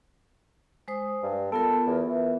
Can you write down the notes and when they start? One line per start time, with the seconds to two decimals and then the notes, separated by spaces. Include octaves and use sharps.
0.88 G#3 C5 D#6
1.23 G2
1.52 B3 F4 A4 A#4
1.87 E2
2.09 E3